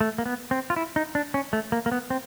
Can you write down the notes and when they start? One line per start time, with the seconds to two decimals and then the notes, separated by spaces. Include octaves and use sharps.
0.01 A3
0.18 A#3
0.26 B3
0.51 C4
0.70 F4
0.76 E4
0.96 D#4
1.15 D4
1.34 C#4
1.53 A3
1.72 A#3
1.86 A#3
1.92 B3
2.10 C4